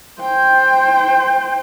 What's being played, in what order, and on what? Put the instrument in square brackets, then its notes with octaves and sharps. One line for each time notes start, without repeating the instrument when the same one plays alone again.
[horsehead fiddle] C5 G5